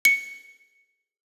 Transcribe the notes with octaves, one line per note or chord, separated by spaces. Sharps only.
C#7